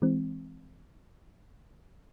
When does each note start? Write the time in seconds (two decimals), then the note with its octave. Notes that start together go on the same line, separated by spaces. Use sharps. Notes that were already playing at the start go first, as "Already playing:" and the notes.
0.02 E3 G#3 C4